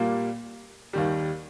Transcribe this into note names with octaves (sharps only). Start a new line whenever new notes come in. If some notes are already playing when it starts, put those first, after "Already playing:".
Already playing: A#2 G3 A#3
D#2 D#3 G3